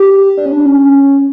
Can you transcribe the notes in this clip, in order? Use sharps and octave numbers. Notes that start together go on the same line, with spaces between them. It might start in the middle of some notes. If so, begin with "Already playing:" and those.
Already playing: G4
D4
C#4
D4
C#4